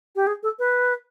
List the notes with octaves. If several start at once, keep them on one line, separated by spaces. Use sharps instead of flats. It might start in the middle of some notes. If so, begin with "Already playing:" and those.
G4
G#4
A4
B4